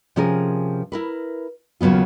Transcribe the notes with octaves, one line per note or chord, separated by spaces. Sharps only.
C3 F3 C#4 G#4 A#4
E4 A#4 B4
D#2 C#3 F#3 B3 F4